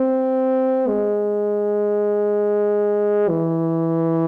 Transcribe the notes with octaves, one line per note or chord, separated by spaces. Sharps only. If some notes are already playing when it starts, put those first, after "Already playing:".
Already playing: C4
G#3
E3